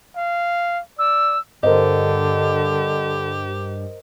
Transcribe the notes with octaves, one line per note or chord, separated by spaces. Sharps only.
F5
D5 E6
G2 D3 G4 A#4 C5 D#5